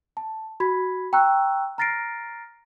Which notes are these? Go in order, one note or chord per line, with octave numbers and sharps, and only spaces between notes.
A5
F#4 B5 G#6 B6
G5 A#5 C#6 E6 F#6
A#5 F6 A6 A#6 C7 D7